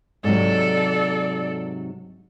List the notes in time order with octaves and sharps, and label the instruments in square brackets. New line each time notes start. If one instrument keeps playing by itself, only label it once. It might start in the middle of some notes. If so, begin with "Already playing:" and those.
[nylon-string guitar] G#2 C3 F#3 [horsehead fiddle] A4 D5